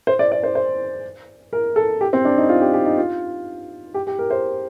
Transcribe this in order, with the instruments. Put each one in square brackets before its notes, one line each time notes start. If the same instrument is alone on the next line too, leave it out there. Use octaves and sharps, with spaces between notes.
[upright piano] C5
D5
D5
C5
C5
A#4
A4
G4
C4
D4
D#4
F4
G4
G4
D#4
F4
G4
G4
A#4
C5